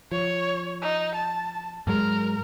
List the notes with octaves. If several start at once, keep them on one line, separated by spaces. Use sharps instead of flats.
F3 C#5
D#4
A5
G#2 F#3 G#3 A#4